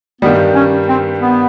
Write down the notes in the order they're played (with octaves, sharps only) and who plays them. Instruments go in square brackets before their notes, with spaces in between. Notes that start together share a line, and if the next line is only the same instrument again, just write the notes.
[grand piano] G2 D#3 G3 [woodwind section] B3
[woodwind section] C#4
C4
B3